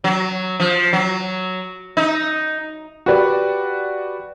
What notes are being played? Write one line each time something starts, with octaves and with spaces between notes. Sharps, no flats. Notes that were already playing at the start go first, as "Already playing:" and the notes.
F#3
F3
F#3
D#4
F#4 G4 B4 D5